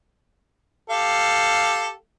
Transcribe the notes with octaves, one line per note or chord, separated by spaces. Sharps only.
G4 A4 F5